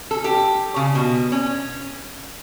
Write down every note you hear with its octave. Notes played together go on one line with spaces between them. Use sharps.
A4
G4
C#3
B2
C#4